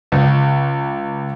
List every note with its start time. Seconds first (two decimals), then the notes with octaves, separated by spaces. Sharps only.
0.12 C#2